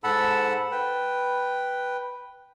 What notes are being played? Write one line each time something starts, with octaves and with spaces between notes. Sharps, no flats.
G#2 A4 F#5 A5 B5 E6
B4 G5